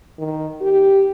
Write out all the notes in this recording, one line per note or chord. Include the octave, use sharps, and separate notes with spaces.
D#3
G4